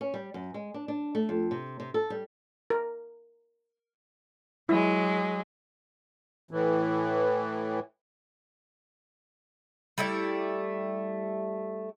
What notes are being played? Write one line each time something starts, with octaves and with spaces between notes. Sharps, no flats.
C#4
G3
F#2
G#3
D4
D4
A3
F2
C3
C3
A4
G3
A#4
F#3 G#3 E4
A2 E3
G3 A3 E4 D5